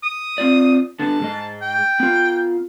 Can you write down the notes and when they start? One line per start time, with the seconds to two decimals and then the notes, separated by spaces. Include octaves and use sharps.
0.03 D#6
0.38 C4 F4 D5
1.00 D3 B3 A5
1.20 G#2 G#3 D#5
1.62 G5
2.00 B3 F4